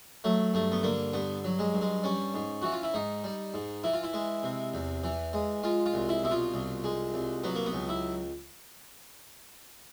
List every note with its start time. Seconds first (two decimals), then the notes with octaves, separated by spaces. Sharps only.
0.24 F#3 A3
0.54 G2 A3
0.72 B3
0.83 D3 A#3
1.13 G2 B3
1.44 F#3
1.59 G#3
1.74 G2
1.81 G#3
2.03 G3 C#4
2.34 G#2
2.62 E3 F#4
2.72 F4
2.83 E4
2.94 G#2 D#4
3.24 G3
3.54 G#2
3.84 E3 E4
3.94 F4
4.04 E4
4.13 G#3
4.43 C3
4.74 E2
5.04 E3
5.33 G#3
5.63 G#3 F4
5.86 F4
5.94 C2
6.09 E4
6.24 B2 E4
6.31 F4
6.54 C2
6.84 G#3
7.14 C2
7.44 F#3 B3
7.55 A#3
7.66 B3
7.73 C#2
7.89 E4